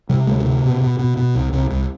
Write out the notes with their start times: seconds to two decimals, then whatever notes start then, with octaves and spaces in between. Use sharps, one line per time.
0.09 C3 G3
0.27 D2 G#3
0.45 C3
0.64 B2
0.81 B2
0.99 B2
1.17 B2
1.35 C2
1.53 C2
1.70 C2